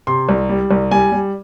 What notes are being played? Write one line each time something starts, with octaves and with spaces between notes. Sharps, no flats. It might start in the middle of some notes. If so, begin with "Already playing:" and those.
C3 C6
C2
G3
C2
G3 G#5
G3